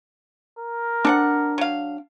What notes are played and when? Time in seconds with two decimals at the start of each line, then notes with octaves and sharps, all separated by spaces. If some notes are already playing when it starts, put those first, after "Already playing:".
0.59 A#4
1.05 C4 D4 A4 F#5
1.58 F#3 F5